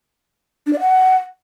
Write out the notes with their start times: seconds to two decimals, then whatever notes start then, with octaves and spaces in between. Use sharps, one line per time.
0.66 D4
0.73 D5
0.80 F#5